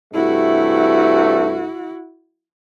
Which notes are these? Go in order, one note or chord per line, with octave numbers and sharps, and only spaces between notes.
G2 C3 A3 E4 F#4